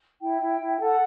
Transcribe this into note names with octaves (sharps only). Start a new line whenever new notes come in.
E4 G5
E4
E4
G5
A4 F#5